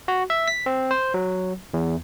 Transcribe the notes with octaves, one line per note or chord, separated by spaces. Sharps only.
F#4
E5
B6
C4
C5
F#3
E2